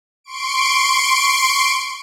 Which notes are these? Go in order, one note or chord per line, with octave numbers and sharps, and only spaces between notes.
C6 C#6 D7